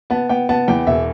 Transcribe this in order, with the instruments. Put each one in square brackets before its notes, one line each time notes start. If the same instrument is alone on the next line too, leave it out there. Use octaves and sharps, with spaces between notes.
[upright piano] B3 A5
B3 G5
B3 A5
E2 G5
E1 E5